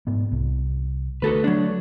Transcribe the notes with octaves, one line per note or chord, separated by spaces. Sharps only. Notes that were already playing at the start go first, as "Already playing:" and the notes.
G#2 B3
C2
D3 A3 F#4 A4 B4
F#3 D4